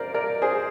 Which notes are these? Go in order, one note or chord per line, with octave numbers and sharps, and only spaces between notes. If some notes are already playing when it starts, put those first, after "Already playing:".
Already playing: A#4 C5 D5
A#4 D5
G#4 C5